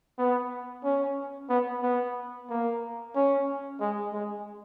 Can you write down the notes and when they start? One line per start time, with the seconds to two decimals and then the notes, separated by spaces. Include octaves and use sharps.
0.18 B3
0.84 C#4
1.50 B3
1.83 B3
2.50 A#3
3.15 C#4
3.80 G#3
4.13 G#3